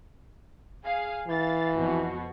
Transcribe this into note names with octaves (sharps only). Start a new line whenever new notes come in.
G#4 F5
E3 F5 A6
F2 B2 F#4